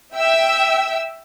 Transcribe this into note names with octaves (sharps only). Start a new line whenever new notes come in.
E5 G5 E6